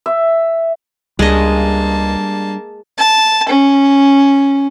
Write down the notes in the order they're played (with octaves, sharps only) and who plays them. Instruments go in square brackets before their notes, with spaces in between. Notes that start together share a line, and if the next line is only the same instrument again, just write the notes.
[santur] E5
[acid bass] C#2 [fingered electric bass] G3 D4 [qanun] G#3 D#5 [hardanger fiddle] A#3 A5
[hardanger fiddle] A5
C#4